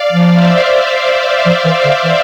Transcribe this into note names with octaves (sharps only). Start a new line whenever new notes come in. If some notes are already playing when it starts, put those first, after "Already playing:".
Already playing: D5 F5
F3
C5 E5
F3
E3
D3
E3